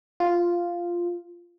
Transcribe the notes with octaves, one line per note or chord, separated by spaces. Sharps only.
F4